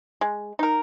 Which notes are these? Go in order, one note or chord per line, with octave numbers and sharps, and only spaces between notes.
G#3
D#4 A#4